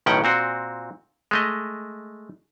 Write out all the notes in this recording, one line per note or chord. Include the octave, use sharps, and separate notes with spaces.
B1 A2 D#3 C#4 F#5 G5
A#2 C4 F#4
G#3 A3 D#5